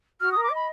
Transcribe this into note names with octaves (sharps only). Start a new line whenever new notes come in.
F#4 F6
A#4 D#6
D6
D#5 B5